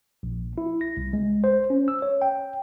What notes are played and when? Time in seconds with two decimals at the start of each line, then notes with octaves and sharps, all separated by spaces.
0.23 A#1
0.58 E4
0.81 A#6
0.97 C2
1.13 G#3
1.44 C5
1.70 C#4
1.88 E6
2.02 C#5
2.22 G5